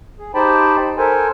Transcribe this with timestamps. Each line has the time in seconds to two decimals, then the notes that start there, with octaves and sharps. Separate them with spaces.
0.19 G#4
0.34 D#4 G4 C5 G5 A5 B5
0.98 A4 A#4 C5 G#5